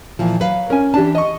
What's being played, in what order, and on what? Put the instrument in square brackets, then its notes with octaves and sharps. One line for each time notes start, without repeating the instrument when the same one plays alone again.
[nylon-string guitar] A#2 E3 F3
F#3 B4 F5
[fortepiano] C#4 G#5 [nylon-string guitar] A#4
[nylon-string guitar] E3 A5 [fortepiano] D4 G4
[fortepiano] D#5 C#6